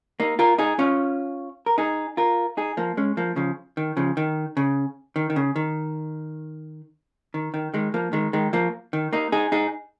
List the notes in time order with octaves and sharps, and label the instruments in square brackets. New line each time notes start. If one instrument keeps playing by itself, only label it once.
[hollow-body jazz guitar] A#3 D#4
F4 A#4
D#4 G#4
C#4 F4
A#4
D#4 G#4
F4 A#4
D#4 G#4
F3 A#3
G#3 C#4
F3 A#3
C#3 F3
D#3
C#3 F3
D#3
C#3
D#3
D#3
C#3
D#3
D#3
D#3
D#3 G#3
F3 A#3
D#3 G#3
D#3 G#3
F3 A#3
D#3
A#3 D#4
D#4 G#4
D#4 G#4